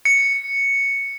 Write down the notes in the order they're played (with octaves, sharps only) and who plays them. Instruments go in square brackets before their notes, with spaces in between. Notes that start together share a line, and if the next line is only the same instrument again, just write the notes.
[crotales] C#7